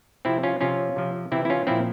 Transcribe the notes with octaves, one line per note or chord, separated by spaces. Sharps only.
C3 F3 C4 E4
C#4 F4
C3 F3 C#4 F4
C3 F3
C3 E3 C4 E4
E4
C#4 F4
A#2 F3 C4 E4